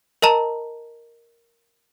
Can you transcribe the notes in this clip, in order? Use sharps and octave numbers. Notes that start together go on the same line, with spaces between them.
A#4 D#5 A5 A#5